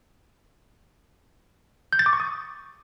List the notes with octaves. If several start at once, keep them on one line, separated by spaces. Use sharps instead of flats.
G6
A6
D6
C#6
D#6